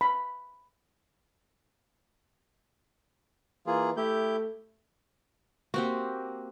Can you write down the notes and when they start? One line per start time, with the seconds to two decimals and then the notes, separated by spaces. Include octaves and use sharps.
0.01 B5
3.67 E3 A#3 F4 G#4
3.97 A3 E4 G4 G6
5.74 A#3 C4 F#4 G4